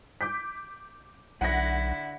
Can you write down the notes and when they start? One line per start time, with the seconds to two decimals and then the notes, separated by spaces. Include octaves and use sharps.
0.21 D6 G6 B6
1.41 B1 D3 E4 F#5 A#6